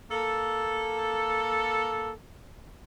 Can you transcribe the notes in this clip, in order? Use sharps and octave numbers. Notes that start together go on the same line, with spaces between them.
A#3 A4